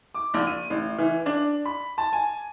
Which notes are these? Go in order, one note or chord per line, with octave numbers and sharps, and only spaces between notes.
D6
A#1
D#7
A1
E3
D4
B5
A5
G#5